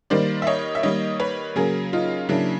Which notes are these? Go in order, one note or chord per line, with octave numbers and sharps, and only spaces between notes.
D#3 G3 A#3 C5 D5
E5
C#5 D#5
E5
D#3 G3 A#3 C#5 D#5
B4 C#5
C#3 F#3 A#3 G#4 A#4
D#4 F4
C#3 F#3 A#3 D4 E4